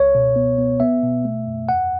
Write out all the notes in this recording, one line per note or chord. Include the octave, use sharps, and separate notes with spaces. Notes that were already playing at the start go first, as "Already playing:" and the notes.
Already playing: C#2 C#5
B2
B3
B3
B3 E5
B2
A3
F#2
E2 F#5